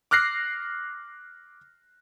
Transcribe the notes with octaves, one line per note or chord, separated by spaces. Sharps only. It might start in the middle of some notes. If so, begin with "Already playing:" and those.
D6 F6 F#6 A#6 C7